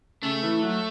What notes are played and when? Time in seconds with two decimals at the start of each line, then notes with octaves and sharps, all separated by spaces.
0.22 C#3 A3
0.43 E3
0.62 F#3